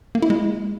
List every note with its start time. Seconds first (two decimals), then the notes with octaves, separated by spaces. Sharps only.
0.15 A#3
0.22 E4
0.30 G#3